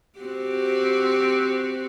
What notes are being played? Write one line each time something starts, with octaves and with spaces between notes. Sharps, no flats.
C4 F#4 G4